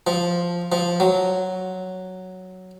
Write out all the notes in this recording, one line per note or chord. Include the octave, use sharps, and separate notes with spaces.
F3
F3
F#3